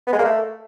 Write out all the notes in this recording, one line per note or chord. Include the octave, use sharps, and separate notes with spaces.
B3
G#3
A#3
A3